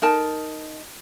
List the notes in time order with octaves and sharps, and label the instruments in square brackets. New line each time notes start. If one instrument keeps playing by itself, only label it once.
[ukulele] D#4 A#4 A5